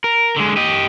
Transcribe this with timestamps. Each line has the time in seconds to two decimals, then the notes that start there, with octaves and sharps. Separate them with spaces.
0.04 A#4
0.36 D3 G#3
0.57 G4 D#5